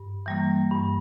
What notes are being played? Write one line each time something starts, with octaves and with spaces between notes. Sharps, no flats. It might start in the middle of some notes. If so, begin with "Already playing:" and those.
Already playing: G2
E3 G3 A#3
G2